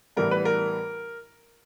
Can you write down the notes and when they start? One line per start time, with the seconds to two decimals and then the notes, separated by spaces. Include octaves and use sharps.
0.16 A2 E3 G3 B3 A#4
0.31 B4
0.45 A#4